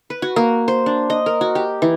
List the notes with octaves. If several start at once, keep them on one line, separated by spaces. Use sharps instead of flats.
B4
F#4
A#3
C5
D4
D#5
A#4
F#4
G4
E3